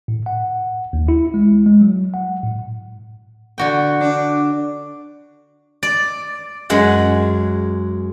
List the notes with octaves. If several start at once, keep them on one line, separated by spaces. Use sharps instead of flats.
A2
F#5
D#2
E4
G#3
G#3
F#3
F#5
A2
D3 F#4 G5
D4
D5
F#2 G#3 F#5